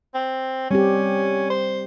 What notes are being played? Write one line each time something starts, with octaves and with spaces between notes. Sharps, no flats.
C4
G3 C4 C#4 G4
C5